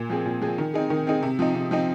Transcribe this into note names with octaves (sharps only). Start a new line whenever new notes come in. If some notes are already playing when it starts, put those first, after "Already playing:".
Already playing: A#2
F3 C4 G#4
A#2
F3 C4 G#4
D#3
C4 D#4 G#4
D#3
C4 D#4 G#4
C3
F3 C4 D#4
C3
F3 C4 D#4